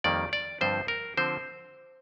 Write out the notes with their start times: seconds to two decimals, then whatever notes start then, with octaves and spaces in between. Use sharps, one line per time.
0.04 F2 D#3 G3 A#3 D5
0.33 D5
0.61 G2 D3 F3 C4 F4 C5
0.88 A#4
1.17 D3 F3 C4 C5